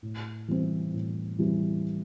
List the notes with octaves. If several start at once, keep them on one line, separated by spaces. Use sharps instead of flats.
A2
E3 G3 C4
A2
E3 G3 C4